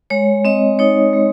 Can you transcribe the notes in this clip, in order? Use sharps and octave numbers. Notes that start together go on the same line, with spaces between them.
G#3 C#5
C4 D#5
D#4 C#5
G#3